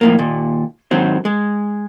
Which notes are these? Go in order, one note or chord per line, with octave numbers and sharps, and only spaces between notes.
F2 A2 A#3
D#2 A#2
G#2 D#3 F#3 C4
G#3